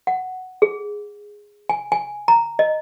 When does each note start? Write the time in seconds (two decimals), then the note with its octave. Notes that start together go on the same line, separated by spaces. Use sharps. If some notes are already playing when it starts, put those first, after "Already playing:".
0.07 F#5
0.62 G#4
1.69 G#5
1.92 G#5
2.28 A#5
2.59 D#5